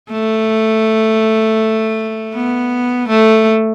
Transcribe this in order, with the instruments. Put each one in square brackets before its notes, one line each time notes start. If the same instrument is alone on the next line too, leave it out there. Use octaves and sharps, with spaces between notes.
[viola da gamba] A3
B3
A3